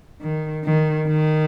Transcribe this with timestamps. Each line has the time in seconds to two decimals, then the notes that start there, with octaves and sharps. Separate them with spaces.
0.21 D#3
0.64 D#3
1.08 D#3